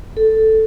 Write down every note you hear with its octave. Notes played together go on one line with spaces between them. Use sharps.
A4